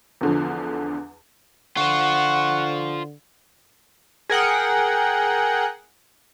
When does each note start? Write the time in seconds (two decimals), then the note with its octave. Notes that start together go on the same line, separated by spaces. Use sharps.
0.21 E2 D3 F3
1.77 D3 F4 C5 F#5 C#6
4.29 G#4 A#4 F#5 G5